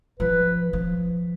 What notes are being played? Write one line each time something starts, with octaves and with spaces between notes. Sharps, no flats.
F3 B4
F3